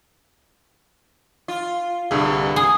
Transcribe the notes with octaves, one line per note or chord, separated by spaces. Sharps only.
F4
C2 G2 D3 G#4
G#4 G#5